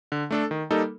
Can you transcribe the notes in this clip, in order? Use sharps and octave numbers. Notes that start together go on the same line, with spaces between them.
D3
A3 D4 A4
D#3
G3 A#3 D#4 A4